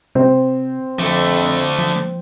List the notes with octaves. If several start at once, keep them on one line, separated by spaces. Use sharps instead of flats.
C3 C4
F2 D3 F3 A3
F3